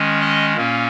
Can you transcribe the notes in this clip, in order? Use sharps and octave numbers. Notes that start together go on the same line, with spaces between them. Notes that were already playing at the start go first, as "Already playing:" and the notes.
Already playing: D#3 G#3 C#4
D#5
A#2 A#3 C#4